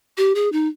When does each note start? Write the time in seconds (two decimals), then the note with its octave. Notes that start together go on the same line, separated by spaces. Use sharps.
0.17 G4
0.35 G#4
0.52 D#4